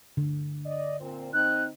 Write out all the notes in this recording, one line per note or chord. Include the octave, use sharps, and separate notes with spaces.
D3
D5 D#5
A#2 C4
C4 D#4 F#6